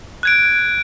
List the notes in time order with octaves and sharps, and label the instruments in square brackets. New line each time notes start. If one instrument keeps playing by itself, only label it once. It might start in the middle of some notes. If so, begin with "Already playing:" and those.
[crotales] F#6 G#6 D7